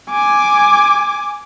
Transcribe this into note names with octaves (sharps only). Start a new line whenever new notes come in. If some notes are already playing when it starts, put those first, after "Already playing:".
G#5 D6